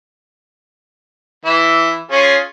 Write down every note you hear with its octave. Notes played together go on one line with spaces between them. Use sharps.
E3 E4
C#4 F4 G#4